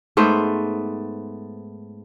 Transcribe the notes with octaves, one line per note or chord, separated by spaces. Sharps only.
G#2 A3 B3 C5